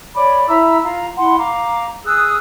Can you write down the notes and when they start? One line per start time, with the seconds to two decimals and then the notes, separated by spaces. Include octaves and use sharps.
0.15 C#5 D5 B5 D6
0.48 E4 E5 A#5 E6
0.83 F4 F5 A#5
1.16 E4 F#5 C6
1.37 F5 A#5 D6
2.05 G#4 D#6 E6 F#6